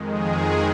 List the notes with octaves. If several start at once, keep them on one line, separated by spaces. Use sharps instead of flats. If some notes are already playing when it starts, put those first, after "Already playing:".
Already playing: F2 D#3 G#3
G#4